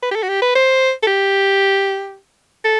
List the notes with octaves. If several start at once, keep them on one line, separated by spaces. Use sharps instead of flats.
B4
G4
A4
F#4
G4
B4
C5
A4
G4
A4